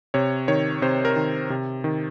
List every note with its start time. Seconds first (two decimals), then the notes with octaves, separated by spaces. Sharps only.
0.14 C3 C#5
0.48 D#3 C#5
0.82 C3 C5
1.05 A#4
1.16 D#3
1.50 C3
1.84 D#3